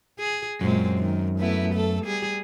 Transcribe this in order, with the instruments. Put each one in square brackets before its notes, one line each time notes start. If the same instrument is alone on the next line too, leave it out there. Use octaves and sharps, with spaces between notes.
[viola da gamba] G#4
[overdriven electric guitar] F#2 [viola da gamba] A#2 G#3 C4
[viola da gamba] D#3
A3 B3 E4
A3 A4
G3 G#4